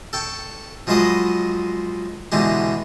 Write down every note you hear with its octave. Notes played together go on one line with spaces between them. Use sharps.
A4 G5 C#6
F3 F#3 G#3 G#4 B4 D#5
B2 D3 E3 G#3 G4